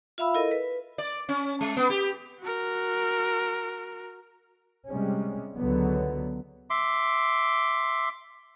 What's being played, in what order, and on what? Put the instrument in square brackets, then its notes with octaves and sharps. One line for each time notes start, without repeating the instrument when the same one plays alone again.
[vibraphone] F4 E5 F5 B5 E6
E4 A4 A#4 D#5
B4
[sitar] D5
C#4
G#3
B3
G4
[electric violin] F#4 A#4
[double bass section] C3 G3 G#3 C#4
C#2 D3 F#3 B3
[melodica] E5 C6 D6